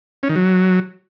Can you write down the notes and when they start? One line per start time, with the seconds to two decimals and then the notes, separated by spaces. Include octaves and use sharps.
0.23 C#4
0.29 D#3
0.36 F#3